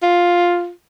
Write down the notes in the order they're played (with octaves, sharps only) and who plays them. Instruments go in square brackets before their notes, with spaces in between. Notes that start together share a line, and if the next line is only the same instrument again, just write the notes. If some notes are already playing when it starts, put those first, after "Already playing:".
[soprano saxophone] F4